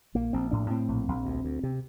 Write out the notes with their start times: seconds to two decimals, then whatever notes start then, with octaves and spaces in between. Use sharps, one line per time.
0.15 A#1 A#3
0.33 A#1 C4
0.51 A2 D4
0.70 A2 C4
0.88 A#1
1.08 A#1
1.26 D2
1.44 D2
1.63 C3